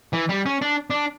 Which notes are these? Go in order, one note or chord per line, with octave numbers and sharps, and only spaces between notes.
E3
G3
C#4
D4
D4